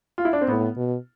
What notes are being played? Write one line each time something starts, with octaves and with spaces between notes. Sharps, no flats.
F4
E4
D4
C4
A2 B3
B2